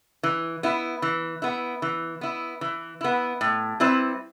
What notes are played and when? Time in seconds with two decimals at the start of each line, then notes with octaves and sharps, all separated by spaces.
0.23 E3
0.63 B3 E4
1.02 E3
1.42 B3 E4
1.82 E3
2.21 B3 E4
2.61 E3
3.01 B3 E4
3.41 A2
3.80 G3 C4 E4 B4